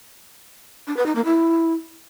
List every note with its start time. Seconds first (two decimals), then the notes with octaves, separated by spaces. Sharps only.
0.87 D4
0.97 B4
1.06 D#4
1.15 A#3
1.25 E4